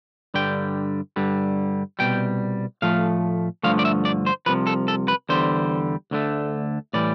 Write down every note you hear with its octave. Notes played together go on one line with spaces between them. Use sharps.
G2 D3 G3 G5
G2 D3 G3
C2 B2 G3 G5
A2 F3 A3 F5
G2 D3 F3 A3 F5
D5
E5
D5
C5
C2 C3 F3 B4
A4
A4
B4
E2 D3 G3 C5
D2 D3 A3
A2 E3 G3 D5